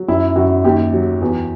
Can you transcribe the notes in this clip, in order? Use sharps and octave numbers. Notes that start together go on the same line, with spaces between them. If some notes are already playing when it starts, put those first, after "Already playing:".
Already playing: F#3
F#2 E4
F#2 F#4
D#2 G4
F#3
E2